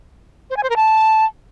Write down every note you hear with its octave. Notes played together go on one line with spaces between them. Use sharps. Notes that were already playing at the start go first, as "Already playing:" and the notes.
C5
G#5
C5
A#4
A5